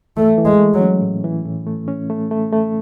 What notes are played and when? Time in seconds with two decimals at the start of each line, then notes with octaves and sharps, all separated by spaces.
0.17 E3 A3
0.38 E3
0.45 G#3
0.59 A3
0.74 F#3
0.81 C#4
1.02 A2
1.24 E3
1.45 A2
1.67 A3
1.88 C#4
2.10 A3
2.31 A3
2.53 A3